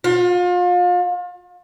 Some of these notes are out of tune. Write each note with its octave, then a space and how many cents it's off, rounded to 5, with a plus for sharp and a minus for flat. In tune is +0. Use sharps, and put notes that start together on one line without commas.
F4 +35